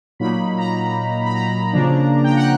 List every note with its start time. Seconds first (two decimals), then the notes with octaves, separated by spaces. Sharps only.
0.19 A#2 F#3 A#3 D#4 B5
0.58 A#5
1.26 B5
1.35 A#5
1.73 C#3 F3 A#3 D4
2.24 G5
2.37 F#5